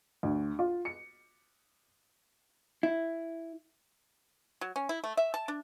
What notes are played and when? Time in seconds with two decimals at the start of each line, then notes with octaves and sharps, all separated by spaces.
0.23 D2
0.59 F4
0.85 C#7
2.83 E4
4.61 F#3
4.76 C#4
4.89 E4
5.04 A3
5.17 E5
5.34 A5
5.48 D4